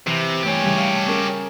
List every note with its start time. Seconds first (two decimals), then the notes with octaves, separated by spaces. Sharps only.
0.07 C3 E3
0.43 G2 A3 G4 C#5 G#5
0.63 C#3 E3 G3
0.77 F5 A5
1.07 C#4 G#4 A#4